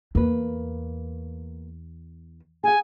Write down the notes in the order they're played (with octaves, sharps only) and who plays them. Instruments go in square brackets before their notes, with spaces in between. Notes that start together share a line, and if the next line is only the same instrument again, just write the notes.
[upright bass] E2 [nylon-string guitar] A#3 B4
[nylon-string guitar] G#4 F#5 [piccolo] G#5